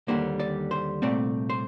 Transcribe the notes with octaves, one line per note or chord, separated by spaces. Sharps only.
D#2 D3 G3 A#3 C5
D5
C5
C2 A#2 A3 C4 D5
C5